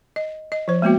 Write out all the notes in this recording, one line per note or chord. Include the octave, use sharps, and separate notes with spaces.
D#5
D#5
F3 C5
G#3 A#3 B3 F#4